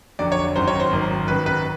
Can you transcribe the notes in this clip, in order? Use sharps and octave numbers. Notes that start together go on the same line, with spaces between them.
F1 F2 D3 F#3 D5
C#5
G#1 F#2 D#3 F#3 C5
C#5
C5
G#1 F#2 D#3 F#3
G#1 F#2 D#3 F#3 B4
B4